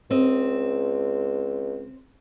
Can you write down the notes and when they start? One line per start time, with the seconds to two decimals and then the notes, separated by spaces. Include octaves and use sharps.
0.11 C#2 C4 D#5